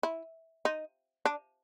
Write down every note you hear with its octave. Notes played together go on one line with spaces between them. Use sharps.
E4
D#4
D4